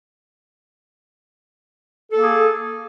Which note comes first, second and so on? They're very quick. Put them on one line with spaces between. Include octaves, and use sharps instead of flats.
A4 A#3 G#4